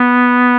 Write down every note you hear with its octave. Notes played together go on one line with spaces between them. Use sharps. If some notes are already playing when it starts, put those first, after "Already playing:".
Already playing: B3